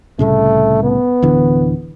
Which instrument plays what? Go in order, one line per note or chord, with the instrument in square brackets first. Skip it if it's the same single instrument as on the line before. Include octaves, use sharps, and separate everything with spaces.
[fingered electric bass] C2 A2 C#3 [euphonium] A3
[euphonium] B3
[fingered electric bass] D1 D3 E3